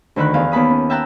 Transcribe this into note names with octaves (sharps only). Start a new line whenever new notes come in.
D2 D3 D#3 B5 F#6
E2 F5
D#2 B3 A5 B5 D#6
C#4
E5 G5 A5 A#5 E6 F#6